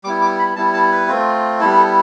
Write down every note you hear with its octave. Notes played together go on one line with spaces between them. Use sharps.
G3 B3 E4 D6
D6
B5
G3 B3 E4 A5
A5
B4
A3 C4 F4
G3 B3 E4 A4
A4